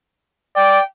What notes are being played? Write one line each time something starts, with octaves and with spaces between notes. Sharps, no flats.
D5 G5